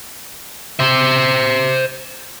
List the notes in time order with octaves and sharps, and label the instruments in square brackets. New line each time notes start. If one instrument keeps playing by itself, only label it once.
[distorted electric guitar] C5 E5